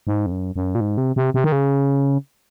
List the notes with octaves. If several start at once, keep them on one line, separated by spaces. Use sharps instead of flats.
G#2
F2
F#2
F#2
A#2
G#2
C3
C3
C3
D#3
C#3